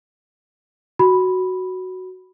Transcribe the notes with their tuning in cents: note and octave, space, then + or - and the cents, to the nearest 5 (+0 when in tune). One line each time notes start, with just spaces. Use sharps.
F#4 +0 B5 +0